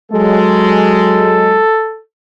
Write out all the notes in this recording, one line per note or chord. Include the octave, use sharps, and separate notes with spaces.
F#3 G#3 A4